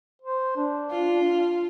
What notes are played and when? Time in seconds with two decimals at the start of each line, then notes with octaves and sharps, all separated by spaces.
0.22 C5
0.57 D4
0.91 F4